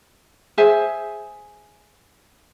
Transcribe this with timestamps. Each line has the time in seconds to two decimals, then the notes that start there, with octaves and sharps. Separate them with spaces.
0.58 G#4 C5 E5 G#5